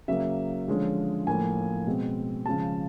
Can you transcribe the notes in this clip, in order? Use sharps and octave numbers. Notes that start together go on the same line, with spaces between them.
C#3 F#3 A#3 E5
D3 F3 G#3 C#4
A2 F3 A#3 C#4 G#5
B2 G#3 C4
C#3 F3 G#3 A5